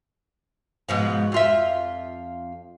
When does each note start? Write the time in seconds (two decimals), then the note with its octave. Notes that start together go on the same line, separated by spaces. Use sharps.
0.89 G#2 B2 F3
1.32 F2 F4 E5